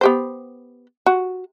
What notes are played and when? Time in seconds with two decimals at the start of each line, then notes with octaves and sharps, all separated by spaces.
0.01 B3 G4 C5
1.06 F#4